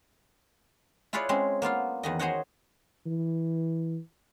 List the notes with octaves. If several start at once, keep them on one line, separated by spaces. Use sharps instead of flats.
E4 F4 G#4 B4 C#5 D5
G#3 C4 C#4 G#4
A#3 B3 F4 F5
E2 D#3 D#5
F#4 G#4 C5 C#5 D#5 F#5
E3